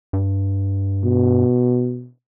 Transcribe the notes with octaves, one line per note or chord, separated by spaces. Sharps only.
G2
B2